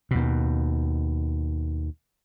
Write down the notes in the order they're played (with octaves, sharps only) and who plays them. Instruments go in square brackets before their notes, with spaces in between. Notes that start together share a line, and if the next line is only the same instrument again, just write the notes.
[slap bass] D#2 B2